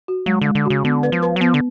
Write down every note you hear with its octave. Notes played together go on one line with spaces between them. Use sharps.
F#4
F#3 G#3
D3 G#3
D3
C#3 F#4
D3 B3
B4
F3
B4
F#3
F3 B3
D3